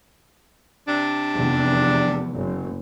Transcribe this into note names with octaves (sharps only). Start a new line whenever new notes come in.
C3 D4
F1 E2 E3
F#1